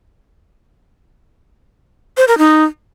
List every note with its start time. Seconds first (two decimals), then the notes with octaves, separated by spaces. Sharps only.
2.17 C5
2.28 A#4
2.38 D#4